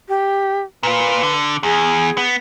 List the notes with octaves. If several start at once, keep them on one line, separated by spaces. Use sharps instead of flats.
G4
A#2 F4 B4
D3
E2 G#4
B3